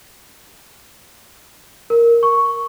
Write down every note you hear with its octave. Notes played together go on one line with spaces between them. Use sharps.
A#4
C#6